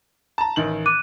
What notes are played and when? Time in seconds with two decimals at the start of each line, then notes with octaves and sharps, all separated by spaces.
0.38 A5 A#5
0.56 A1 D#3 F#7
0.86 D6 F#6 D#7